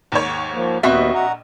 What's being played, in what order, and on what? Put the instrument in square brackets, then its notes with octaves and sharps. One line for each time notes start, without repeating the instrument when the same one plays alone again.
[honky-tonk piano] D#2 G#2 C#5
[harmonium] F3 A#3
[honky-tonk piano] A#1 D#5 C#6 [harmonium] D#2 B3 [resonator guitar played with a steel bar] C4 F#4 E5
[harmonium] F#5 A#5